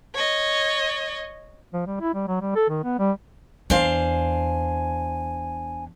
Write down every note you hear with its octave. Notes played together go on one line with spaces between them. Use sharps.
C#5 D#5
F3
G3
E4
G3
F#3
G3
A4
D#3
B3
G3
E2 D4 C5 F5 G#5